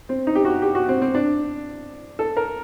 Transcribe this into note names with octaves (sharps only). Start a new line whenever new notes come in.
C4
D#4
G4
F#4
G4
F#4
C4
C4
D4
A4
A#4